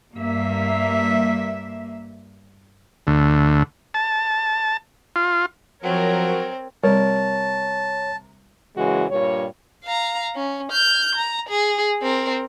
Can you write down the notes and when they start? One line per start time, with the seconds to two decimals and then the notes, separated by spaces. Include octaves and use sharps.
0.14 G2 A#3 E5
3.07 D2
3.94 A5
5.16 F4
5.83 F3 F#3 C4 A#4 C#5
6.84 C3 G3 A#4 C#5 A5
8.77 F#2 C#3 E3 G#3 F#4
9.10 G2 A#2 G3 C#5
9.84 F5 A#5
10.35 C#4
10.71 F6 G6
11.15 A#5
11.49 G#4
12.02 C4 A#4